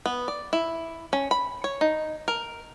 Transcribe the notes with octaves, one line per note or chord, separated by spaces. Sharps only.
B3
D5
E4
C#4
B5
C#5
D#4
A#4